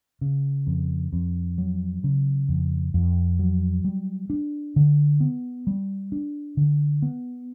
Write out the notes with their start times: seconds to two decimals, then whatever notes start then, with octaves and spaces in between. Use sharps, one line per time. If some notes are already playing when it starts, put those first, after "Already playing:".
0.21 C#3
0.67 F2
1.13 F2
1.58 F#3
2.04 C#3
2.49 F2
2.94 F2
3.39 F#3
3.84 G3
4.30 D4
4.76 D3
5.20 B3
5.67 G3
6.12 D4
6.57 D3
7.02 B3